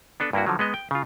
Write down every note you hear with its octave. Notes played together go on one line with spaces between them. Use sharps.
B3 D4 A4 B4
G2 A#3 E4 F#4
D3 F3 F#3
G#3 B3 D#5
G5
C#3 F4